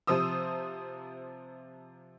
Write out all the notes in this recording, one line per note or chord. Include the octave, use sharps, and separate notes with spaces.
C3 F3 C5 D#6 E6